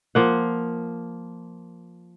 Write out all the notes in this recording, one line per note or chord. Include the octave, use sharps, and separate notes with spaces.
F3 A#3 F#5